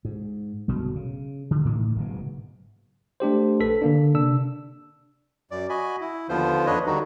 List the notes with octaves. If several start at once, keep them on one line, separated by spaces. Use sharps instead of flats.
G#2
G1 B2 D3 F#3
C#3
D3
A2 D#3 E3 A#3
F#1 G#2 B2
A3 D4 G4 C5
A#1 A4 B4 B6
D3 A#3 D4
C3 D4 E6
F#2 D5
F#4 D#5 G#5 B5
E4
D#2 D3 F3 B3 F4 C5
F2 D4 B4 C#5 D#5
D3 D#3 G3 D#4 F#4